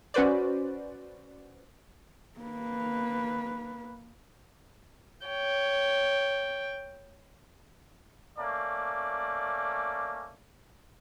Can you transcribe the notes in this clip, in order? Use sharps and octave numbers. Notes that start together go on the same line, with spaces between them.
C#4 F#4 B4 C5 D5
A#3 B4
C#5 G5
A3 A#3 C#4 D5